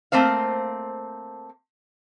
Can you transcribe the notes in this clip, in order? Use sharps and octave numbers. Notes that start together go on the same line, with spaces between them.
A3 A#3 C4 C5 F5